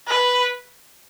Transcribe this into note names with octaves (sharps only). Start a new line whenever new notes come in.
B4